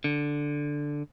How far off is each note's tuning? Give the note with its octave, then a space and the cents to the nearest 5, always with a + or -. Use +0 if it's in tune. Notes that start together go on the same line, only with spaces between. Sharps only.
D3 +0